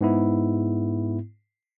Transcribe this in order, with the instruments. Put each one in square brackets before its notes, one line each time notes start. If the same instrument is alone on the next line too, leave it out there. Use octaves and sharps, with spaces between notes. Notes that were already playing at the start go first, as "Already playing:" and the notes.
[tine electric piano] G#2 B3 E4